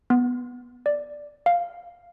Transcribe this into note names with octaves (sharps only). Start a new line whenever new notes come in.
B3
D5
F5